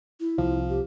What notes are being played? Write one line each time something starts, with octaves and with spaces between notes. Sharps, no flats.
E4
C2 F3
G4